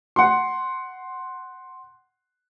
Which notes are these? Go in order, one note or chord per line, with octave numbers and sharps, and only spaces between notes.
F#5 C6